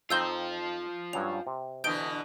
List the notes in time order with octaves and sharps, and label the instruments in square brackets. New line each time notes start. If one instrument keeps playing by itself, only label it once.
[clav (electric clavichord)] F2 C4 D#4 [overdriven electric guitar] F4 C5 [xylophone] E6 G6 G7
[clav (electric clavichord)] G2 F#3 C#4 [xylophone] F7
[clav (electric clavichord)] C3
[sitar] B2 D3 E3 [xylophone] G6 D7 G7